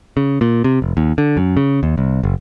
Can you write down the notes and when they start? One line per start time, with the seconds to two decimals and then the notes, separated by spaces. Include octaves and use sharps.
0.17 C#3
0.41 A#2
0.64 C3
0.82 F1
0.97 D#2
1.18 D3
1.37 F#2
1.57 C#3
1.83 D#2
1.98 C2
2.24 F#1